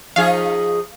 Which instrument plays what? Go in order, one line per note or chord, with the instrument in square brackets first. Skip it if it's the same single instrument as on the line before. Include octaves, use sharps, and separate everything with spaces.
[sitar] F3 D#4 G#4 [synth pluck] F5